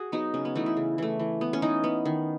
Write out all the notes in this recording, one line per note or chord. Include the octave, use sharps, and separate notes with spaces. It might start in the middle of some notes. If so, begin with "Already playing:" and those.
Already playing: F#4 G#4
F#3 B3 D#4
C#3 C#4
B3
E3 A3 D#4
E4
C#3
E3 A3
E3
B3
C#4
E3 D#4
B3
D#3